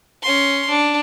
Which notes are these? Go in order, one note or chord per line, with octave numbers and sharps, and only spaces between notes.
C#4 C6
D4